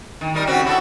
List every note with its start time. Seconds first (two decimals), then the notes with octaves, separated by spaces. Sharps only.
0.21 D#3
0.34 G3 D#4 A#4
0.47 C#3 C4 F#4
0.65 E4 F#4 A4